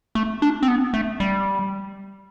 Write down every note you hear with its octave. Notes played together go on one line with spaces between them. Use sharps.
A3
D4
C4
B3
A3
G3